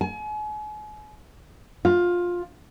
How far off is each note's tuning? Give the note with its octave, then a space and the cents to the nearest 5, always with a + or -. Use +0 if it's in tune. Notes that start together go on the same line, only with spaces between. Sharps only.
G#5 +40
F4 +15